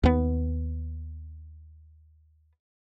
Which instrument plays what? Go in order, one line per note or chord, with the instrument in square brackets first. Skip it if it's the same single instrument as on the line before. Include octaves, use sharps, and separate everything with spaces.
[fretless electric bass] D#2 B3